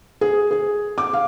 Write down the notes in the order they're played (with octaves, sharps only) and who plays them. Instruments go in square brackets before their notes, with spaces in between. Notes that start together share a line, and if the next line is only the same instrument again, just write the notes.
[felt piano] G#4
G#4
D6
F5